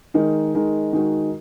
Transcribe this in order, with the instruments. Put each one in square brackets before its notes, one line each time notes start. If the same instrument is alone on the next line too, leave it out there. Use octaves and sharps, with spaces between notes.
[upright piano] D#3 G#3 D#4 A#4
D#3 G#3 D#4 A#4
D#3 G#3 D#4 F#4 A#4